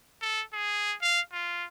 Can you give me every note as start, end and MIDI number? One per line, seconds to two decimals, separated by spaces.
0.22 0.43 69
0.53 0.95 68
1.02 1.21 77
1.33 1.65 65